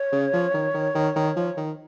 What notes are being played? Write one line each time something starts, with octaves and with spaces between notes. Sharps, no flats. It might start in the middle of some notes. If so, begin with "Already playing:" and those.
Already playing: C#5
C#3
F3
D#3
D#3
D#3
D#3
F3
D#3